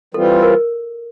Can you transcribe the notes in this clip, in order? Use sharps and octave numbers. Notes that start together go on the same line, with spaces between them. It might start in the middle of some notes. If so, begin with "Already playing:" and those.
E3 G3 C4 F4 A4
A#4